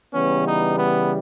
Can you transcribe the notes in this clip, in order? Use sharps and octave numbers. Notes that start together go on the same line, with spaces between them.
C#3 E3 G3 B3 C#4
D#4
B3